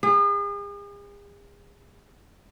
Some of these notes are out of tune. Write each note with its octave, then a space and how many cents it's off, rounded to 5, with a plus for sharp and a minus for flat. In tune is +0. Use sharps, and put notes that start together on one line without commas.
G#4 -40